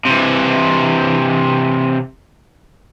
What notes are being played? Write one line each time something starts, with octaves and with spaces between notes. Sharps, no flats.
C3 E3